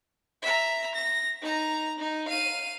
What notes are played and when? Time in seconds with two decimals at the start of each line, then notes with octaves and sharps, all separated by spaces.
0.42 E5 A#5
0.95 A#6
1.42 D#4 A#5
1.99 D#4
2.28 F5 D#7